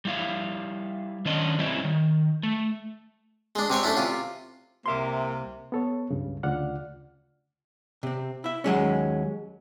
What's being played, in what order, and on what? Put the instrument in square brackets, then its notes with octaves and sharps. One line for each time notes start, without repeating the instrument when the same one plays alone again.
[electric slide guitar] G3 E4 F5
D#3 C#4 D4 D#5
G3 C4 C#4 E4
D#3
A3
[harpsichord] G#3 D4
C3 C4 C#5 C#6
A3 C#4 D4 E4
C3 F4
[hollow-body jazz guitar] C2 E5 C6 [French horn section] C3 [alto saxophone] A#3
[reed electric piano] B3 A4 C#5
C#2 G2 C#3
D2 C#3 F4 D5 F#5 F6
[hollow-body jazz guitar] C3 C4
E4 E5
D#2 F#3 G#3 C#4